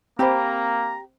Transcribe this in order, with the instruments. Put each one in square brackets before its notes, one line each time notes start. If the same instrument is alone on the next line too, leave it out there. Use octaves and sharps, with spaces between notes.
[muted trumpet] A#3 [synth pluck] C4 C5 [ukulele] G4 G5 B5 [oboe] A#5